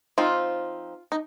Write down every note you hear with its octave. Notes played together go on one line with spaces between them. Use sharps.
F3 C4 D#4 F4
D#4